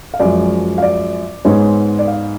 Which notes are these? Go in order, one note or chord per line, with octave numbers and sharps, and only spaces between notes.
F5
F#2 F3 G#3 D5
F5
D5
G#2 G#3 B3 C#5
D5
F5